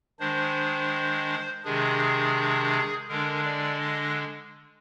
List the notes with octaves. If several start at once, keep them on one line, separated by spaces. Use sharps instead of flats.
D#3 G#3 D4 C5
C3 D#3 G#3 D4 G#4
D3 G#3 D4 A#4
D5
D#5